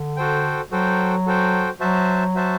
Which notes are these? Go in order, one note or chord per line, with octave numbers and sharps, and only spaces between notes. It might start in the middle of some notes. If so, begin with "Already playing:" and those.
Already playing: D3
F#4 A4 C5 G5
F#3 F#4 A4 C5 G5
F#4 A4 C5 G5
F#3 F#4 C5 E5 A5
F#4 C5 E5 A5